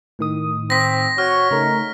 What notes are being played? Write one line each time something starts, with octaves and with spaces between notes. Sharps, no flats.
A2 D#3 D#6
C4 A#6 B6
F#4 C#5 F6
C#3 A3 D#4 A#4